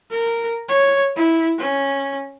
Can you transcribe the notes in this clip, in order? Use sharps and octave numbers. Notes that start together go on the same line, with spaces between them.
A#4
C#5
E4
C#4